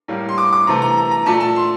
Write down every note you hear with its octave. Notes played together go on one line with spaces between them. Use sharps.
A2 G3 A#3
C6
D6
D6
C3 E3 A3 A#5
A#5
A#5
A#5
A#2 A3 A5
A5
C6